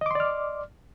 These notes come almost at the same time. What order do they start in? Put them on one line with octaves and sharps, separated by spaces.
D#5 D6 C6 D5 F6